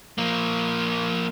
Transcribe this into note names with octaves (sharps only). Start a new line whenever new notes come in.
F3 A#3